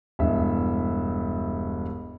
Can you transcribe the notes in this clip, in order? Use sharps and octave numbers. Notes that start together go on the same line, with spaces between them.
E1 G2 E5